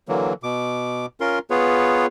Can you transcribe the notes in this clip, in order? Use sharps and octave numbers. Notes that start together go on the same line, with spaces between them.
D3 E3 F#3 A#3
B2 D6
C#4 F4 A#4 C6
B3 F4 G#4 B4 C#5